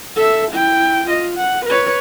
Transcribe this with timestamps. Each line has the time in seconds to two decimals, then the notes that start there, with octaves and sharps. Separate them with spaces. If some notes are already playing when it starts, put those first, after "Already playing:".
0.16 A4 E5
0.52 E4 G5
1.06 F4 D#5
1.36 F#5
1.66 B4 C#5